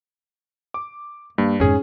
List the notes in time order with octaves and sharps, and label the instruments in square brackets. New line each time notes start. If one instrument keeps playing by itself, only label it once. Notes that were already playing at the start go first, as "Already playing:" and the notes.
[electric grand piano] D6
[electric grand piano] G2 [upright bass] A#3
[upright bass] F2 G#2 [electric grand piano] C#4 G#4